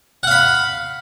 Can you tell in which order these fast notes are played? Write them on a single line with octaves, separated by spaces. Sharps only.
F#5 F5 B5